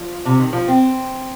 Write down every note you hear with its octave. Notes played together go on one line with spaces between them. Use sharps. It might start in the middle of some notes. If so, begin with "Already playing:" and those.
Already playing: F3
C3
D#3
F3
C4